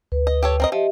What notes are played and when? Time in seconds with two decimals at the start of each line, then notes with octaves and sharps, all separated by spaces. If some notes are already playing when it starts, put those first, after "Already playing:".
0.12 D2 B4
0.27 D#5
0.43 G4 A4 C#5
0.60 C4 A#4 D#5
0.72 F3 G4 D#5 E5